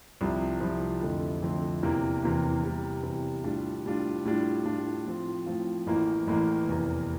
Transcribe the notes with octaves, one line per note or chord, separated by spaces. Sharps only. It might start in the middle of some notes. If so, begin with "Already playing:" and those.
C2 C3 F3
C2 C3 F3
F2 D3 F3 A3 C4
F2 D3 F3 A3 C4
E2 C3 E3 A#3
E2 C3 E3 A#3
E2 C3 G3
E2 C3 G3
A2 G3 D4 F4
A2 G3 D4 F4
A2 G3 D4 F4
A2 G3 D4 F4
A2 F3 C4 F4
A2 F3 C4 F4
A1 A2 E3 A#3
A1 A2 E3 A#3
F1 E2 C3 E3 A#3